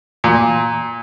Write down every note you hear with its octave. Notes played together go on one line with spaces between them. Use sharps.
A#2